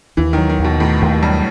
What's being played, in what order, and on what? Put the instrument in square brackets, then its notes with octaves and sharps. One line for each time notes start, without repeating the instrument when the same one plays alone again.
[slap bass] D#2 [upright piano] E3
[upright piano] D#3 [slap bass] F#3
[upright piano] D#3
[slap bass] D#2
[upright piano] B2
[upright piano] A2 [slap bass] D#3
[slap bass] D#2 [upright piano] A2
[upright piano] G2 [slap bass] F#3